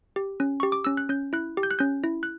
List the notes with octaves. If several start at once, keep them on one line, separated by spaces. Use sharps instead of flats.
G4
C#4
G4 C#6
D6
C#4 E6
F#6
C#4 G6
E4 F#6
G4
G6
F#6
C#4 G6
E4
F#6